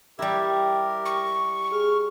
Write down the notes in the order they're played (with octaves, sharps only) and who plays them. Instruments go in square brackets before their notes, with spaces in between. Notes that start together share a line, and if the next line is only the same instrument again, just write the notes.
[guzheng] G3 E4 [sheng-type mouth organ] G4 A#4
[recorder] C#6
[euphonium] G#4 [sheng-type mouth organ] F6